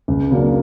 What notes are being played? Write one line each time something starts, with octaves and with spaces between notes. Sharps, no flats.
C#2
C#3 F#3 A#3 D4